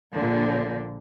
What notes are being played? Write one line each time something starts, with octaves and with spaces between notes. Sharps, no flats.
A#1 A#2 D3